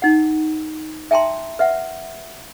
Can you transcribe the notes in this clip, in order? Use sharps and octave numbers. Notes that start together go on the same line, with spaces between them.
D#4 F#5
E5 G5 A5 A#5 C6
B4 E5 F#5